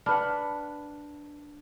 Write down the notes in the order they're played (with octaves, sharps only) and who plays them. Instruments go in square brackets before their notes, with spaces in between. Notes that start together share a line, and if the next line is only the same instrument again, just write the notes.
[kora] D4 B4 F#5 [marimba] A5 B5 F6